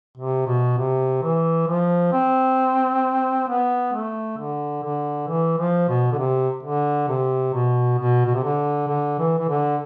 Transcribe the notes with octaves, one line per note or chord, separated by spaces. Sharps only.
C3
B2
C3
E3
F3
C4
B3
A3
D3
D3
E3
F3
B2
D3
C3
D3
C3
B2
B2
B2
C3
D3
D3
E3
E3
D3